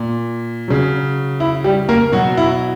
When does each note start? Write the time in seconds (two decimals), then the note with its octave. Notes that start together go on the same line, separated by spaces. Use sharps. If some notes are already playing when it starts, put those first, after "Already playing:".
Already playing: A#2
0.68 C#3 F#3
1.40 E4
1.64 G3 G4
1.89 A#3 A#4
2.12 B2 F#3 F#4
2.37 E4